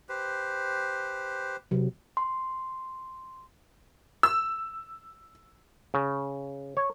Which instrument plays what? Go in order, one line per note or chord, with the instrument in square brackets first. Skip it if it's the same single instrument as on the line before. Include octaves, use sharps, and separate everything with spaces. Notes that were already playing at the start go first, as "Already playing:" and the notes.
[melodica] G4 B4 C5
[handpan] C3 F#3
[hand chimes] C6
[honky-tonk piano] E6
[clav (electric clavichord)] C#3
C#5